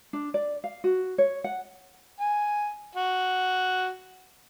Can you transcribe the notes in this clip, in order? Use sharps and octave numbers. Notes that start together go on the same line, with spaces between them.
D4
D5
F5
F#4
C#5
F#5
G#5
F#4